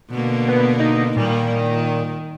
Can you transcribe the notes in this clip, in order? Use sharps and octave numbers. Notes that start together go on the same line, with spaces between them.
B2 D3 A#3
B3
D#4
A#2 D#3 G3 A#3
D#3